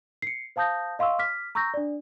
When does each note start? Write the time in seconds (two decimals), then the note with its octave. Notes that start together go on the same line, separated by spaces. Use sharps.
0.22 C7 C#7
0.56 C5 F5 A5 D#6 G6 A#6
0.99 D#5 F5 C6 C#6 E6
1.19 D6 F6 B6
1.55 A#5 C#6 E6 G6 A#6
1.74 D4 D5